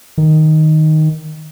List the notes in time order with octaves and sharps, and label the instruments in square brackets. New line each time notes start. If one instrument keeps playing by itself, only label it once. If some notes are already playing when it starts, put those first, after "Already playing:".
[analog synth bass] D#3